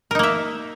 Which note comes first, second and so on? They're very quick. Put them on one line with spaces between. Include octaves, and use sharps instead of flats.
A#4 D#4 A#3 E5